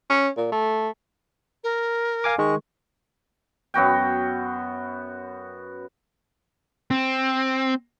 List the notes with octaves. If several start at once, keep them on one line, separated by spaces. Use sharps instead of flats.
C#4
A#2
A3
A#4
F5 G#5 D6
D#3 G#3 C#6
F#2 B3 F#4 G5
C4